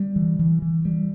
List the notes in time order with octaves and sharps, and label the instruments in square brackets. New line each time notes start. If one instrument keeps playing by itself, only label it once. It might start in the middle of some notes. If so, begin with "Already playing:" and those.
Already playing: [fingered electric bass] G3
E3
E3
E3
G3